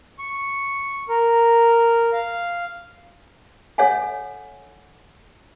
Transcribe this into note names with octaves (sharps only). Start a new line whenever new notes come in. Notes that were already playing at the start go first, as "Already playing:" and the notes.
C#6
A#4
F5
A4 C#5 E5 F#5 G#5